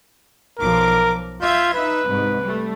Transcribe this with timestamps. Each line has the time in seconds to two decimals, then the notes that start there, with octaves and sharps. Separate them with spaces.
0.58 B1 F3 A#4 D6
1.42 F4 E5 G6 G#6
1.74 D#4 B4 E5
2.06 C2 G#2
2.41 G3 A3